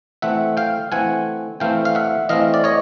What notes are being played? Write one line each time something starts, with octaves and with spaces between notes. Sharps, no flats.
E3 A3 C4 E5 F#5
F5 G5
E3 A3 C4 F#5 G#5
E3 A3 C4 F5 G5
F5
E5 F#5
E3 A3 C4 D#5 F5
D5
C#5 D#5